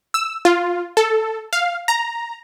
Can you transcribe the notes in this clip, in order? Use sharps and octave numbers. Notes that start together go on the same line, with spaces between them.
E6
F4
A4
F5
A#5